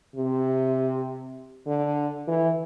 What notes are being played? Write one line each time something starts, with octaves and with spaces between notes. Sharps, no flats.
C3
D3
E3